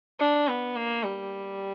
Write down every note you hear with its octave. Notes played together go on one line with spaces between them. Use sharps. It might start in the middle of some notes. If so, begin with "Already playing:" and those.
D4
B3
A#3
G3